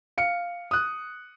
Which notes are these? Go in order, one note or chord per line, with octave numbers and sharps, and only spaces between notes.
F5 C#7
D#6 F#6